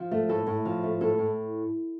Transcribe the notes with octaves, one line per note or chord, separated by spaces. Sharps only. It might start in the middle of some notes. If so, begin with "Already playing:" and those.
Already playing: F3
A3
A2 A4
A2
F3
A3
A2 A4
A2